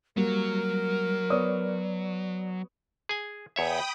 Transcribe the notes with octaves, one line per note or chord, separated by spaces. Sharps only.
F#3 G3 A#3 A#4
B3 C#5 D5 D#6
G#4 G#5
E2 C#5 E5 G5 B5 D#6